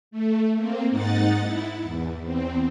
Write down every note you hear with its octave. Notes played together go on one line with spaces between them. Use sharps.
A3
A#3 C4
G#2 D#4 F#5 A6
E4
E2
E2 C4